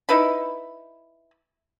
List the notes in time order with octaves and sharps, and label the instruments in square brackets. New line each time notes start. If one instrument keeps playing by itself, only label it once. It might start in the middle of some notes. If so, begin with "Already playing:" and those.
[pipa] D#4 E4 B4 B5